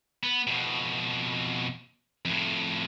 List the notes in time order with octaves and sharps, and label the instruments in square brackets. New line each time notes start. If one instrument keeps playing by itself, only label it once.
[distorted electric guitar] B3
F2 B2
F2 A2